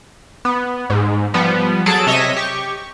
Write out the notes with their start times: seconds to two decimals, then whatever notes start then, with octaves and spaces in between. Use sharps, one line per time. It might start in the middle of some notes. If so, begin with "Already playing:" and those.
0.45 B3
0.90 G#2
1.34 F3 G3 B3
1.86 F#3 G#4 A4 A5 D7
2.07 C3 C#5 D#5 E5 A#6 B6
2.36 G4 C#6